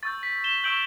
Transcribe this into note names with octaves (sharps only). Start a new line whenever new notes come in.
C#6 E6 G6 A6
B6
E7 G7
C#6 E6 G6 D7 F#7